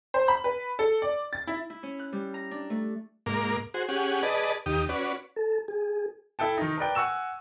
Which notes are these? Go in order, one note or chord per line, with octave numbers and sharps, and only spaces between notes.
C5
B5
B4
A4
D5
A6
E4
E4
C#4
F#6
G3
A#5
D4
A3
G#2 A#3 A#4 D6
F#4 G#4 C5
C#4 G4 G#4 F#5
G#4 B4 D5 D#5 A5
D#2 G4 D#6
C#4 F#4 B4 D5
A4
G#4
E4 A4 G5 A5
D#3 D#4
A#4 B4 D5 G5
F#5 G#5 C#6 E6 E7